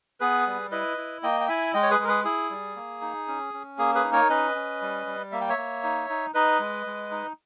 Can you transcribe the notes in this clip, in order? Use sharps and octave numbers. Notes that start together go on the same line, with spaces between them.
B3 G#4 B4
G3
E4 B4 D#5
E4
A#3 D#5 G5
G5
E4 E5 G#5
G#3 D#5 G5
C#5
G#4 B4
G#3 A#4
G#4 B4
E4 G#4
G3
A#3
D#4
C#4
C#4
A#3 G#4
G#4 B4
D#4
A#4 C#5
C#4 B4 D#5
C#4
G3
G3
A#3 E5
G5
C#5 E5
A#3
D#4
D#4
D#4 B4 D#5
G#3
G#3
D#4